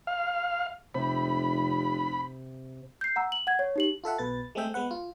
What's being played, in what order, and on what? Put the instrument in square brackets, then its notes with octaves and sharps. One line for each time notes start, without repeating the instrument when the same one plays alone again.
[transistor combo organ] F5
[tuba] F1 [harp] C3 [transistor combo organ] B5
[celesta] G6 C7
F#5 A#5 E6
F#7
F#5 G#6
C#5
D#4 G4 F#7
[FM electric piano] F4 A4 E5 F#5
B1 B2 B4 A6
G#3 A3 C4 G#4 E5 G5
G#3 B3 B4 F#5
F4